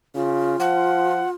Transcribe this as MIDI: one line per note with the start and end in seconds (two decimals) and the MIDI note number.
0.15 0.58 49
0.15 1.34 65
0.60 1.23 53
0.60 1.29 78